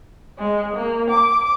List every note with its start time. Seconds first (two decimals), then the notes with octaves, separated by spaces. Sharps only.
0.38 G#3
0.75 A#3
1.10 D6